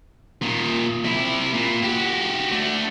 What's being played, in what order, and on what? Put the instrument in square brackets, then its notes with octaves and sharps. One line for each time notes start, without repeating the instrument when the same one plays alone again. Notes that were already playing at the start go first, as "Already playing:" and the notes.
[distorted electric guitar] A#2 D#3
C3 E4
A#2
F#4 G4
A3 D4